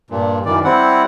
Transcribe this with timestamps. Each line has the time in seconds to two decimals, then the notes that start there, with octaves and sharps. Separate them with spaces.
0.10 G2 A#2
0.46 F#2 D#3 E3 D5
0.64 G3 C4 E4 F#5